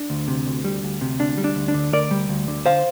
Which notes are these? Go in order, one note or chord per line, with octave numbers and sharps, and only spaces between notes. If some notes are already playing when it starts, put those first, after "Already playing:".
Already playing: D4
D2
C3
D2
G3
D2
C3
D2 D4
G3
D4
D2
D4
D3
D2 A#4 D5
G3
D2
D3
C5 F5